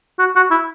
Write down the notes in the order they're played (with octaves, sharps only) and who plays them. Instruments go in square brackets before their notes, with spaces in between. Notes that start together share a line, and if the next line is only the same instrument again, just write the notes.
[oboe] F#4
F#4
E4